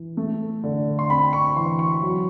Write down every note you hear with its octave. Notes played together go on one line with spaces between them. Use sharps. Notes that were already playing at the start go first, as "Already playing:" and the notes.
Already playing: E3
A3
D3
C6
C4 B5
C#6
E3 C6
C#6
F#3